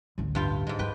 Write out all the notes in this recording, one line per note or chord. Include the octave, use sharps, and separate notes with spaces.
A1 D2
G2 F4 G5
G#2 G#3
F#2 B4 G5